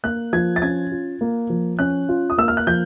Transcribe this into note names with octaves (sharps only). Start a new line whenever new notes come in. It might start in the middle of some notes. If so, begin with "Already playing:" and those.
A#3 F#6
F3 G#6
A6
C#4 G#6
F4
A#3
F3
C#4 F#6
F4
D#6
A#3 E6
F6
F#6
F3 G6